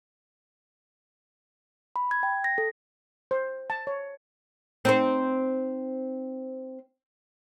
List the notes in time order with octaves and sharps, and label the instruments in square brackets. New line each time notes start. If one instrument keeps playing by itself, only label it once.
[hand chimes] B5
G#6
G5
A#6
A4
[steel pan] C5
A5
C#5
[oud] C4 D#4 C5